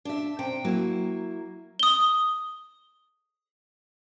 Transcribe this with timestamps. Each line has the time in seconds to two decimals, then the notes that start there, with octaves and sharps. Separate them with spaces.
0.05 D4 E5
0.39 C3 G5
0.64 F#3 A#3 E4
1.79 D#6 G7